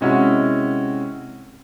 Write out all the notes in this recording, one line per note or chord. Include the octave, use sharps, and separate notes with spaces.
C3 G#3 C#4 E4 F#4